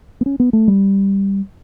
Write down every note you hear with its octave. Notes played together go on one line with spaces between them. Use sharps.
B3
C#4
B3
A3
G3